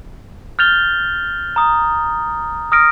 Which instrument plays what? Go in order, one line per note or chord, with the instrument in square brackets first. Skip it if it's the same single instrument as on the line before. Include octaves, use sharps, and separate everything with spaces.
[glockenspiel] F6 G6 A6 F7 G7
A#5 D#6
D#6 F6 A#6 D7